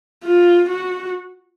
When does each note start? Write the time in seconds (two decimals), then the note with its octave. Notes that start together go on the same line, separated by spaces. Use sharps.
0.24 F4
0.69 F#4